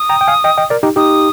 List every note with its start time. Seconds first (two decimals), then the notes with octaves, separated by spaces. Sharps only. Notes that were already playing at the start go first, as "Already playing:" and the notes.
Already playing: D#6
0.09 G5 A#5
0.21 G5
0.27 F5 G#5
0.44 D#5 G5
0.57 D#5 G5
0.70 A#4 D5
0.83 D#4 G4
0.96 D#4 G4 D#6